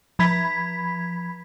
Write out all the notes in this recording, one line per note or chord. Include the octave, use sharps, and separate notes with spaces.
F3 B5 G#6 B6